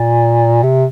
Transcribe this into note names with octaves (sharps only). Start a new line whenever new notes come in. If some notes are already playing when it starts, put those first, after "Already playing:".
Already playing: A#2
C3